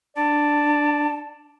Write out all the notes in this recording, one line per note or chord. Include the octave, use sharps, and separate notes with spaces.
D4 D5 A5